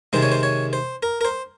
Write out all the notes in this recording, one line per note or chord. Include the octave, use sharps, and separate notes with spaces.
C3 D#3 G#3 C5
C#5
C5
C#5
C5
A#4
A#4
C5